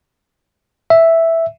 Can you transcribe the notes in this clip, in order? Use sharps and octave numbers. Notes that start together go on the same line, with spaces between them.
E5